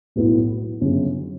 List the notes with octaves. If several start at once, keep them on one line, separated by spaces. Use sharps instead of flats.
B1 A2 F#3 B3 E4
G1 F#2 C#3 F#3